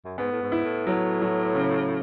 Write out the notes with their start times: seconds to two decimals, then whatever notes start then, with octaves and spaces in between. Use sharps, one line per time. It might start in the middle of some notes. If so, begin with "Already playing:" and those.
0.05 F#2
0.18 G#2 B3
0.31 A2
0.42 G#2
0.52 E4
0.64 A2
0.87 A2 F#3
1.22 F#3
1.55 C#3